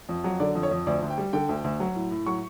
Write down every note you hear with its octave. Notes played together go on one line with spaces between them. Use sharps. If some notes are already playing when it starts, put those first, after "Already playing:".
F2
F#3
D3 D5
F2
C#5
F2
D2 D5
D2
G5
G3
D3 G5
D2
D2
F#3
A2
A2
F#3 C#6